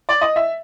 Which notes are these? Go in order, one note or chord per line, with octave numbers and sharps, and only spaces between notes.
D5
D#5
E5